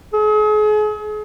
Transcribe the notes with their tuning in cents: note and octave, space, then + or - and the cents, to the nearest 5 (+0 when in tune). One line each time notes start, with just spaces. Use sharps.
G#4 +40